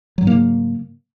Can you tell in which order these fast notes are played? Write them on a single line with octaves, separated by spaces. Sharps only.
F#3 G#2 A#3 C#3